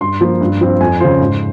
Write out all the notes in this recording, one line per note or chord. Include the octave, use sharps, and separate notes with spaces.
G2 C6
F3 A#3
G2
F3 C4
F2 G#5
C#3 F3 C5
G#2